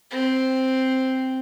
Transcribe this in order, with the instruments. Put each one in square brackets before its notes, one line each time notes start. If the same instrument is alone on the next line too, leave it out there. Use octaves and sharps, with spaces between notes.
[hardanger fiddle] C4